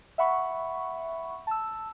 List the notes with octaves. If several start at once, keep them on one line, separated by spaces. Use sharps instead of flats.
E5 F#5 B5 C#6
A5 E6